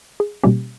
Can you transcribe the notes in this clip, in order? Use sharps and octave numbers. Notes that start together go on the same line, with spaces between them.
G#4
B2 G3 A#3 C#4 G4